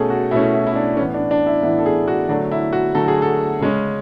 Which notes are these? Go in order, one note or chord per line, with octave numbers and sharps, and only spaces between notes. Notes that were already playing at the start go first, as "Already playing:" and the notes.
Already playing: B2 A3 C#4 G#4 A4
F#4
B2 A3 C#4 E4
E4
E4
D4
A2 E3 B3 C#4
D4
D4
E4
A2 E3 B3 E4
A4
G#4
F#4
D3 F#3 A3 D4
E4
F#4
D3 F#3 A3 A4
G#4
A4
C#3 G#3 C#4